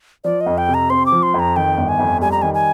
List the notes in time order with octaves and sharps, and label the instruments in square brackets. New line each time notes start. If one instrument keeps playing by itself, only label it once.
[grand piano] F3 [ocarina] D5
[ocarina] D#5
[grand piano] F2
[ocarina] G5
[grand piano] C3
[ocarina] A#5
[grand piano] C4 [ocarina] C6
[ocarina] D6
[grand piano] F3
[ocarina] C6
[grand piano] F2
[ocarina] A#5
[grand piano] D#3 [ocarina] G5
[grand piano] G1
[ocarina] G#5
[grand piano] F2
[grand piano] G3 [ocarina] G#5
[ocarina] A#5
[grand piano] D#3 [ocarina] G#5
[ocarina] G#5